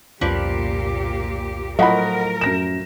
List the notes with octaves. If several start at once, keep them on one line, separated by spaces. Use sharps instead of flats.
C2 F2 A#2 F3 C#4 G4 B4 D5
A2 F3 F#3 A#4 D#5 F#5 B5
F#2 A#6 E7